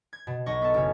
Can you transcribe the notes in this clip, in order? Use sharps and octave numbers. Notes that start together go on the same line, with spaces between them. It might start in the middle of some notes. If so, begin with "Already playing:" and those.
G#6
B2
B1 D#5 C#6
B3 A4
F#1 C#4